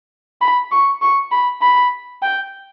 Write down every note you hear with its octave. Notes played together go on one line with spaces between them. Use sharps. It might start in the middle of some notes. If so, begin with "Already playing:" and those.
B5
C#6
C#6
B5
B5
G5